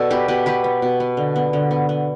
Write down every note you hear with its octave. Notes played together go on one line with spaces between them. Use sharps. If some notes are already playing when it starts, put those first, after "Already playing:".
Already playing: B2 A4 D5
B3 G4 B4
B2 G4 B4
B3 G4 B4
B3
B2
B3
D3
B3
D3
B3
B3